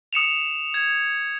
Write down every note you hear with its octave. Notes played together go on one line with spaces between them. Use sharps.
D#6 C#7 E7 F7
G#6